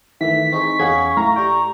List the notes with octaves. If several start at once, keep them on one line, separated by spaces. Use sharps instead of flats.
D#3 E3 A3 E5 B6
C4 D#4 G#4 C#6
E2 C#4 G#4 F5 F#5 G#6
A2 F5 A#5
G4 D5 G5 C#6